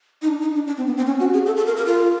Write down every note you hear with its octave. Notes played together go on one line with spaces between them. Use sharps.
D#4
D4
D#4
D4
D4
C4
B3
C4
C#4
F#4
G#4
A4
A4
A#4
A#4
F4